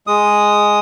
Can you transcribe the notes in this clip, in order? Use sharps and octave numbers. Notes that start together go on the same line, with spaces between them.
G#3 D#6